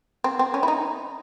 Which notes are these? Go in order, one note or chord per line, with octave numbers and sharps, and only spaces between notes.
C4
C4
C#4
E4
D#4